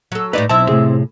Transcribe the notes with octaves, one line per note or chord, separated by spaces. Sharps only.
F#3 A4
A2 G3 D#4 B4 D5
B1 C4 E4 E5 A5
A2 C3 G#4